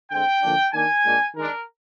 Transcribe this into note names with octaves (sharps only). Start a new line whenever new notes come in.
D3 G#3 C4 G5
D3 F3 A#3 D4
D#3 A#3 D4 G#5
A#2 G#3 D4
D#3 G#3 D4 A#4